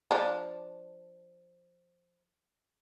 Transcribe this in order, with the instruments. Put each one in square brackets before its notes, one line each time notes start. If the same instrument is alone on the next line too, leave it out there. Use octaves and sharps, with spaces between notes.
[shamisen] F3 D4